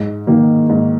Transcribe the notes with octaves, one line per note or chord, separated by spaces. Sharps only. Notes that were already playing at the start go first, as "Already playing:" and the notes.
Already playing: G#2
D#3 A#3
G#2